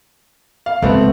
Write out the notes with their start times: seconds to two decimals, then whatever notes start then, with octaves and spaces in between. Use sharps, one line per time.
0.66 F5
0.82 C#2 A3 B3 C4